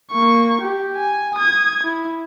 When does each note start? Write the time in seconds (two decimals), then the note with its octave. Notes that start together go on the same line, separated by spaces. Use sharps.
0.12 A#3 C#6
0.61 G4
0.97 G#5
1.35 D#6 G#6
1.83 E4